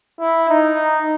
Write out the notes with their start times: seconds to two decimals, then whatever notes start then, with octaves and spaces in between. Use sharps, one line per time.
0.20 E4
0.49 D#4